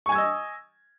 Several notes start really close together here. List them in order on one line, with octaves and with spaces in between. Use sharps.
C#6 G#5 G#6 E6 D#5